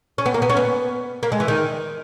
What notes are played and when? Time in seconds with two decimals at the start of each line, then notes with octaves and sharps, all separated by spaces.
0.18 C#4
0.26 B3
0.34 A#3
0.42 B3
0.50 C#4
0.57 B3
1.23 A#3
1.32 G#3
1.40 E3
1.48 D#3